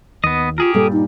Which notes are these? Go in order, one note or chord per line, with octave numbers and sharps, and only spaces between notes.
D#2 B3 D#5
F4 G4 G#4 A#4
G2 A#2 G3 A4
D#4